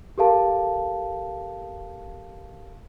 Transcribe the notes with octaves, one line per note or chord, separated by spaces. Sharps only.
G4 A4 A#4 F5 A5